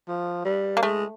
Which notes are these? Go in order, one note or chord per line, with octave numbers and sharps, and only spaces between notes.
F3
G3
A#3
G#3 A3